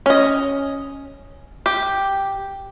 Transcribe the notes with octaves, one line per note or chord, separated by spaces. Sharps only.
C#4 D#5
G4